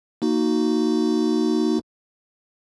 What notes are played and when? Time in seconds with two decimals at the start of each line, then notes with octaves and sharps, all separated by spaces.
0.22 A#3 D#4 F#4